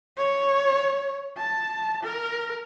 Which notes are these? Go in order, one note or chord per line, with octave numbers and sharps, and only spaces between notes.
C#5
A5
A#4